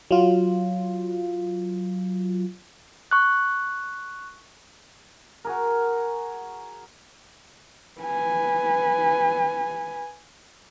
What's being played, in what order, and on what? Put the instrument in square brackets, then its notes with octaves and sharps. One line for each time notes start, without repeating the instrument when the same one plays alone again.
[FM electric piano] F#3 F4
[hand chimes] C#6 F#6
[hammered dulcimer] F#4 G#4 A#4
[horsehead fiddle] B4 G#5